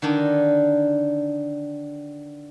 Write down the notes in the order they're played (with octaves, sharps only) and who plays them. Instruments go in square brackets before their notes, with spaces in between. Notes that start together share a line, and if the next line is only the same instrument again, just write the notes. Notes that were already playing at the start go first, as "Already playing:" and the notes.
[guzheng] D3 D#3 D4 D#4